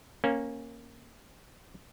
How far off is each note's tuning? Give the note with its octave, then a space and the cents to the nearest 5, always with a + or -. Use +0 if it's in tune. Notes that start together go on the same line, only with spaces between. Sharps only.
A#3 +0 C#4 -15